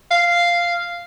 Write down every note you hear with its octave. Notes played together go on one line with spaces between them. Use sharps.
F5